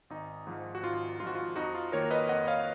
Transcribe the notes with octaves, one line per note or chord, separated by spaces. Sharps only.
G#1 D#4
G#2 F3
F#4
G#1 F4
G#2 F3 F4 F#4
F4
F2 D#4 F#4
F4
D#3 A#3 A#4 C#5
B4 D#5
F2 D#5 F#5
C#5 F5